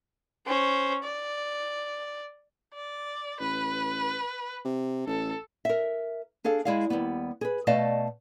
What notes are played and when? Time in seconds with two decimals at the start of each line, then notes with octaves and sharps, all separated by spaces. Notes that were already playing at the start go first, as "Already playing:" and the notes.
0.47 C#4 C5
1.04 D5
2.74 D5
3.40 A1 B4
4.65 C3
5.07 A1 A4
5.65 A#4 E5
6.44 D4 G#4 A4 F5
6.65 G#3 E4 G#4 D5 F5
6.90 D#2 C3 G3 B3
7.41 G#4 A#4 B4
7.67 B2 A3 D5 D#5 F5 A5